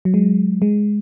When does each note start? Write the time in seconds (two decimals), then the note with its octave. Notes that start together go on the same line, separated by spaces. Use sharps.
0.05 F#3
0.14 G#3
0.62 G#3